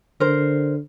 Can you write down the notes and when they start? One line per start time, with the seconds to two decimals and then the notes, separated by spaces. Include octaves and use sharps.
0.20 D3 A#4 C5